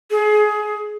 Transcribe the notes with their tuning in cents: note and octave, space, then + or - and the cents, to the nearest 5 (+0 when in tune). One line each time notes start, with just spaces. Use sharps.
G#4 +25